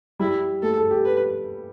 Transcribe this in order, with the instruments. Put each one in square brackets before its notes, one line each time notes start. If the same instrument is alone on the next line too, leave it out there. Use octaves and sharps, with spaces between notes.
[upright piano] G3 [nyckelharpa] E4
[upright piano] A3 [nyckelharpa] A4
[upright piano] A4
G4
[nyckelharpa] B4